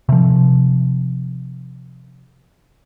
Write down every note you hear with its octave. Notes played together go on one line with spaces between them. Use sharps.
C3 F3